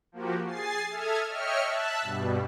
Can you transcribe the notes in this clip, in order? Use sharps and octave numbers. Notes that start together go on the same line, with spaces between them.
F3 A#3 F#4 G4
G#4 G#5 A6 C7
A4 E5 A5 D#6 F6 G#6
C#5 D#5 E5 G5 F6 C#7
E5 A5 E6 F#6
G2 B2 G3